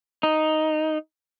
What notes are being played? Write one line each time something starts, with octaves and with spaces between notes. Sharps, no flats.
D#4